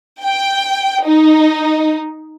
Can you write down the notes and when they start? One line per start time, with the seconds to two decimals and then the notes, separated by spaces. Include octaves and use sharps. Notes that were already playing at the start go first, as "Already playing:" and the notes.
0.22 G5
1.04 D#4